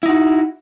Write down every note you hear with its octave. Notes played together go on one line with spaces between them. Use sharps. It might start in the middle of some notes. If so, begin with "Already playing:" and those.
D#4 E4 F#4